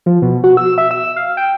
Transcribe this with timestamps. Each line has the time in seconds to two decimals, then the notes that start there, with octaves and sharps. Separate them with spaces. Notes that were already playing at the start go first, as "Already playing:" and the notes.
0.06 F3
0.22 B2
0.44 F#4
0.57 E6
0.78 E5
0.91 E6
1.16 F5
1.37 G5